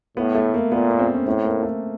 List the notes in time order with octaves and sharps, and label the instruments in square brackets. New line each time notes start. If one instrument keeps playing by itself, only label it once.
[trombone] A2 [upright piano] B3
[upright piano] A3
A#3
[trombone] A#2 [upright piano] B3
[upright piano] B3
C4
C#4
[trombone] A2 [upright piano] C4
[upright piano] A#3
A3